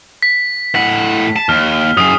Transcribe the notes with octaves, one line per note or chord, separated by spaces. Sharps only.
B6
A2 F#5 B6
A5
D#2 F6
F#2 G#4 D#6